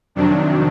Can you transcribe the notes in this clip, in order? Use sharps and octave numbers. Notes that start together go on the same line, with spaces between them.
F2 C3 D#3 F#3 D4